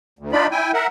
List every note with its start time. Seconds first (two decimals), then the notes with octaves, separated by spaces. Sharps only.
0.19 D2
0.32 D4 D#4 F4 D5 B5
0.51 E4 G5 G#5
0.74 A#4 E5 F#5